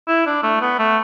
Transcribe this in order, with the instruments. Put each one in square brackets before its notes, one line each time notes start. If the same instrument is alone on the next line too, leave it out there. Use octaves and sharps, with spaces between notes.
[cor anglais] E4
D4
A3
B3
A3